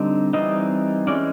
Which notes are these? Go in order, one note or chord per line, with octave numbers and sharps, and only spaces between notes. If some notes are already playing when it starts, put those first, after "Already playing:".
Already playing: D3 G3 C4 D#4
E3 G3 C4 D#4 D#5
E3 G#3 C#4 D5